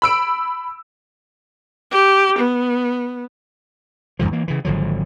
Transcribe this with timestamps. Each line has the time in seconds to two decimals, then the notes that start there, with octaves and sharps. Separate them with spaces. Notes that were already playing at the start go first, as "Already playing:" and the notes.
0.02 B5 E6 D7
1.91 G4
2.39 B3
4.19 E2 G#2 D3 F3
4.31 E3 A#3
4.48 C#3 E3
4.65 G#1 D3 F3 F#3